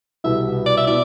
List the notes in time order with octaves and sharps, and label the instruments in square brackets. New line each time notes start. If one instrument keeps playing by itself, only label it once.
[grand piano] C2 B2 B3 E4 [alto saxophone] E5
[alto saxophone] D5
E5
[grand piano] B2 B3 E4 [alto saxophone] D5